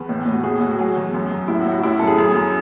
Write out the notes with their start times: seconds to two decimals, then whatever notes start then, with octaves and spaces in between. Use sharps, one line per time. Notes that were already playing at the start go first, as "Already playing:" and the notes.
Already playing: E2 B4
0.09 A2
0.26 A2
0.33 F#4
0.43 A2 G#4
0.60 A2 F#4
0.71 F#4
0.79 F#3 G#4
0.96 E2
1.14 F#2
1.32 F#2
1.48 A2 E4
1.60 F#4
1.65 A2
1.72 F#4
1.83 F#2 E4
1.99 F#2 A4
2.07 G#4
2.18 F#2 G#4
2.35 F#2